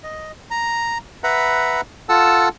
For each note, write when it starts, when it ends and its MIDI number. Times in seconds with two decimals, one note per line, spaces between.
0.04 0.32 75
0.51 0.98 82
1.24 1.81 71
1.24 1.81 76
1.24 1.81 78
1.24 1.81 82
1.24 1.81 83
2.09 2.49 65
2.09 2.49 69
2.09 2.49 78
2.09 2.49 81
2.09 2.49 88